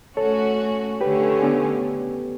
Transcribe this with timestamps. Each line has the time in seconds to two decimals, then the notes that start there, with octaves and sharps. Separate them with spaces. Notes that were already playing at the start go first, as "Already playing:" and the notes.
0.17 A3 C#4 F#4 A4 C#5
1.01 D3 A3 C#4 G4 B4
1.42 B3 D4